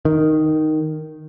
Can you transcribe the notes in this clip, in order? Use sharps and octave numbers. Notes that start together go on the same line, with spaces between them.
D#3